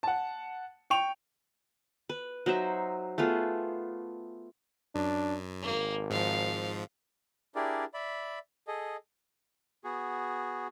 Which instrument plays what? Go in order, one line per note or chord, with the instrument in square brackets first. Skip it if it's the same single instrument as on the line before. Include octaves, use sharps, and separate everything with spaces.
[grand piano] F#5 A5
G5 C#6 F7
[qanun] B4
F#3 D#4 C5 E5
A3 B3 F4 G#4
[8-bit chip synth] F#2 [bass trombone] D4
[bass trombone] G#1 [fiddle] A#3
[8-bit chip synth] G#2 F3 [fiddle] F5
[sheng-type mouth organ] D4 E4 G4 G#4 A#4 D5
D5 E5 B5
G#4 A4 D#5
[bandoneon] B3 F#4 G#4